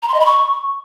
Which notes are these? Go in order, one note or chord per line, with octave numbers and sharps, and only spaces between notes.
A#5
C6
D#5
B5
C#6